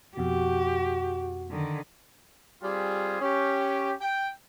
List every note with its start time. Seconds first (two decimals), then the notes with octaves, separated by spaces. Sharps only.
0.17 F2 B2 F#4 G4
1.51 D3 D#3
2.62 G3 C4 F4 G4 G#4
3.21 C#4 G4
4.00 G5